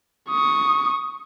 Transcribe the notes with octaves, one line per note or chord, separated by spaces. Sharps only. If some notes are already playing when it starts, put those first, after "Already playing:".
C#6 D#6